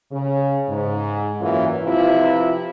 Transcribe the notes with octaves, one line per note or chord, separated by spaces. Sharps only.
C#3
G#2
F#2 A#2 E3 F#3 F4
C3 F3 E4 F4 B4